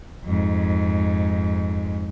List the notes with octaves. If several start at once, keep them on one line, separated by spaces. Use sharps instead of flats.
F2 G#2